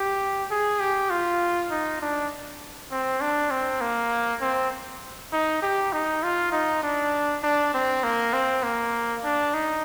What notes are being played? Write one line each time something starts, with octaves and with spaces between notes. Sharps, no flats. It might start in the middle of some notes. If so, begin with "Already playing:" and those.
Already playing: G4
G#4
G4
F4
D#4
D4
C4
D4
C4
A#3
C4
D#4
G4
D#4
F4
D#4
D4
D4
C4
A#3
C4
A#3
D4
D#4